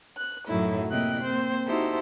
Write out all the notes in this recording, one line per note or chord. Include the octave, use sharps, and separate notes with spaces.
F#6
F#2 A2 F#3 A3 D#4 E4
C3 A#3 E4 D#5 G5 F#6
A#3 C4 C5
D#4 E4 F#4 G4 A4 C5